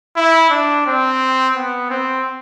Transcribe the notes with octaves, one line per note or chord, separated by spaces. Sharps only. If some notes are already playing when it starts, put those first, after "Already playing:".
E4
D4
C4
B3
C4